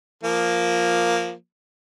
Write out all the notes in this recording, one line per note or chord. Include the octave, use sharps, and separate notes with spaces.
F3 A#3